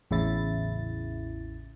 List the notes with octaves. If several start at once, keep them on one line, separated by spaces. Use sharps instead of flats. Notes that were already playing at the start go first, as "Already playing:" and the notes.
A1 E2 C#3 E4 A6